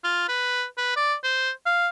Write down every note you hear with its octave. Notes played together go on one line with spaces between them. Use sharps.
F4
B4
B4
D5
C5
F5